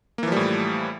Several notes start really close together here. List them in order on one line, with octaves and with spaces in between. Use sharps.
A#3 E3 F3 G3 A2